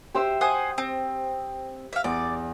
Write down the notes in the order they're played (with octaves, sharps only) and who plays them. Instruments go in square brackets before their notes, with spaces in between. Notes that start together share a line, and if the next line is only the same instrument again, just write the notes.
[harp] G4 C5 E5
[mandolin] C5 F#5 G#5 [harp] D#6
[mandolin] C4
E5 F5
[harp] E2 [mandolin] D5